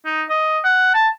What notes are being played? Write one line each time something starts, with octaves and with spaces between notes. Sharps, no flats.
D#4
D#5
F#5
A5